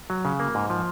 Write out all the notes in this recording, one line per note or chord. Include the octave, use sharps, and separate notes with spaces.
F#3
C#3
A#3
G#2
F3